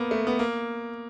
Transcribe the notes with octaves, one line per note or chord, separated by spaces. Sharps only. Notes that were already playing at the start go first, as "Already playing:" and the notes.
Already playing: A#3 B3
A3
B3
A#3